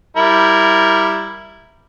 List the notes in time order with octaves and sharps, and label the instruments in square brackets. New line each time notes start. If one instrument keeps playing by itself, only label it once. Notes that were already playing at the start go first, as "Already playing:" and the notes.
[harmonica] G3 E4 A#4